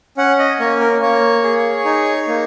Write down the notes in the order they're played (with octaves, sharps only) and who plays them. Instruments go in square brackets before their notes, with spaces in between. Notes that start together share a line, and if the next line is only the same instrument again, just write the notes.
[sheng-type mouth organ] C#4 F#5
D#5
A#3 C#5
A#4
A#3 C#5
G#4
D#4
A#3